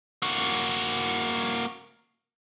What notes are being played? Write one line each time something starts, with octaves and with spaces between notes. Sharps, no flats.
A#3 F#4